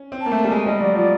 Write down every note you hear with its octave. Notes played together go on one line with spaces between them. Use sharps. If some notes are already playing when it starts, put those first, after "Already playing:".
Already playing: C#4
C4
A#3 A5
A3
G3
G#3 G#5
G3 D#5
F#3 D5
F3 D5